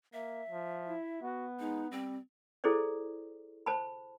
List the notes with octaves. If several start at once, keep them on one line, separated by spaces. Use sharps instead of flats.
A#3 E5
F3
E4
B3 F#4
G#3 D#4
G3 C4
E4 G#4 A4 C5 D5
C5 A5 B5